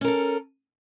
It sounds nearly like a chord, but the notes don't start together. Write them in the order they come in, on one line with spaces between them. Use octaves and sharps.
C#4 A#4 A4